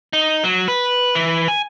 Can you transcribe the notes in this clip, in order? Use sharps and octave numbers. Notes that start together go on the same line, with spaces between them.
D#4
F#3
B4
E3
G#5